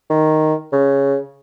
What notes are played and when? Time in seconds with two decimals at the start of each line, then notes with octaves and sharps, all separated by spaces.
0.10 D#3
0.73 C#3